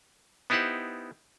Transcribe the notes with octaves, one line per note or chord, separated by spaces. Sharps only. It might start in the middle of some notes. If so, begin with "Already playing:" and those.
B3 D#4 E4 G4 C5 F#5